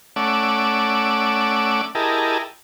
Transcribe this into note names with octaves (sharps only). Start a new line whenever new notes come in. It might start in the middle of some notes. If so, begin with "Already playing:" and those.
A3 C#4 D5 F#5 D6 E6
E4 G4 G#4 A#4 D#5 A5